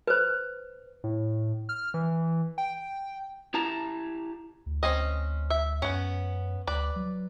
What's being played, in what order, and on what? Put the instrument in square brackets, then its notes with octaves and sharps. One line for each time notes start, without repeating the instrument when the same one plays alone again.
[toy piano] B4 C5
[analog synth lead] A2
F6
E3
G5
[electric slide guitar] E4 G4 A5 A#5
[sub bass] D2
[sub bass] D2 [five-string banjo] C4 C#4 D#5
[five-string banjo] E5
[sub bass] F#2 [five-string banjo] B3 C#4
[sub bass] D2 [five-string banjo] B4 D5
[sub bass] F#3